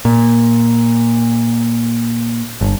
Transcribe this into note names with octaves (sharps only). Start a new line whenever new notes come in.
A#2
G1